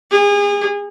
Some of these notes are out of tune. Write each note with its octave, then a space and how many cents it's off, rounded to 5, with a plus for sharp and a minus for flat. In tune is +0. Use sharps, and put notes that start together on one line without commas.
G#4 -35